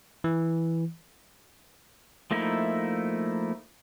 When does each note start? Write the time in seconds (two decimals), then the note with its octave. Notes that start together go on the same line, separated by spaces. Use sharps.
0.24 E3
2.31 F3 A3 A#3 D#4 E4